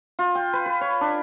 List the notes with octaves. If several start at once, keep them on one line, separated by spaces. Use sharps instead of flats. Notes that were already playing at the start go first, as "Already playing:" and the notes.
F4
G5
B4
B4
C#5
D4